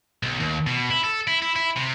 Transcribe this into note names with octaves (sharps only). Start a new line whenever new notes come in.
B1
D#2
B2
E4
A4
E4
E4
E4
C3